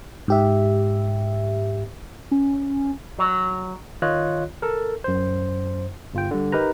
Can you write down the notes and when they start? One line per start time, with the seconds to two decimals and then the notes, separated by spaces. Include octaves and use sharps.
0.28 G#2 G4 E5
2.31 C#4
3.19 F#3
4.02 D#3 F4 C#5 D#5 F#6
4.62 A4 A#4
5.04 F#2 C5
6.14 G1 F4 G5
6.31 D3 G3
6.52 D#4 G4 A#4 B4 A#5